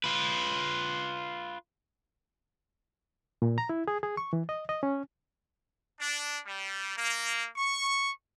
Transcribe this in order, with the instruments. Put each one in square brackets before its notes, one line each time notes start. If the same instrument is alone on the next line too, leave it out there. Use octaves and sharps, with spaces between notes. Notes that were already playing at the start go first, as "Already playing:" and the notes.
[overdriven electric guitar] F4 B4
[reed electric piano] A#2
A#5
E4
G#4
G#4
C#6
E3
D#5
D#5
C#4
[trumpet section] D4
G3
A#3
C#6